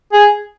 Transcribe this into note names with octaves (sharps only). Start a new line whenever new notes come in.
G#4